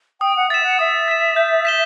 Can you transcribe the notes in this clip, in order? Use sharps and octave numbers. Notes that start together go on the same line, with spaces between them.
G5 D#6
F#5
E5 A6 E7
F#5
E5 D#6
A6 E7
G6
B6 E7 G7